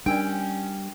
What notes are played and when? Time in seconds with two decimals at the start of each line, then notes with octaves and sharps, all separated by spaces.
0.06 G3 C#4 D4 A#4 D5 G5